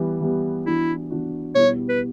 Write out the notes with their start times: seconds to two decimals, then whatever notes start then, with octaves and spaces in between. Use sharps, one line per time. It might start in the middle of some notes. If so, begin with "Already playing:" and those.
Already playing: E3 G3 B3
0.21 E3 G3 B3
0.66 E3 B3 D4 E4 F#4
1.10 E3 B3 D4 F#4
1.55 B2 G3 B3 E4 G4 C#5
1.89 B4